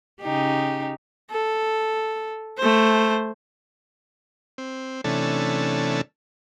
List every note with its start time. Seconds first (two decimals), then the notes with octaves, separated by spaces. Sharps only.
0.21 C#3 D#4 G4
1.31 A4
2.58 A3 C5
4.58 C4
5.04 C3 E3 A3 C#4 D4 A4